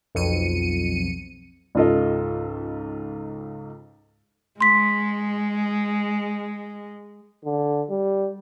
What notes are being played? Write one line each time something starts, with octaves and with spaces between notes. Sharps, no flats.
B1 F2 C#7 D#7
C#2 G#2 F4 A4 D#5
G#3 C6 B6
D3
G3